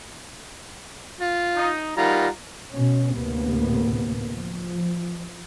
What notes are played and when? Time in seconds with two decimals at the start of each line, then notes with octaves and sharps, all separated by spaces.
1.20 F4
1.56 D#4
1.97 D#3 G3 F4 F#5 A#5
2.72 B2 C#4
3.13 D2 A2 C3 A#3 B3
4.32 F3